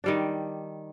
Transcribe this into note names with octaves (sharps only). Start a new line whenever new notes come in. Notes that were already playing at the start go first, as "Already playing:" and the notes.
D#3 G3 D4